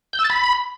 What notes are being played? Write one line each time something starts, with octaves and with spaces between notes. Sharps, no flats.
G6
E6
A6
B5